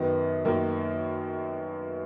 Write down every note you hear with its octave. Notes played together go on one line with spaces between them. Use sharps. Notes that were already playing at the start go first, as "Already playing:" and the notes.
Already playing: F#2 D#3 B3
F#2 D#3 A#3